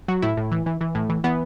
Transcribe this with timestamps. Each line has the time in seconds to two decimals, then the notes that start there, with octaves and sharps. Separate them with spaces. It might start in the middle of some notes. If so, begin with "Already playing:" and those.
0.08 F#3 F#4
0.22 A2 E4
0.37 A2
0.52 E3
0.66 E3
0.81 E3
0.95 A2
1.09 E3
1.24 E3 B3